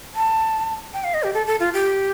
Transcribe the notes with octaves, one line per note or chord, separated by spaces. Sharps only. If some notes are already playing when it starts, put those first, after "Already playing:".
A5
G5
F5
D#5
G4
A4
A4
F4
G4